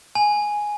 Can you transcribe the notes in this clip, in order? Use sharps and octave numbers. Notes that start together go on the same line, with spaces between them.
G#5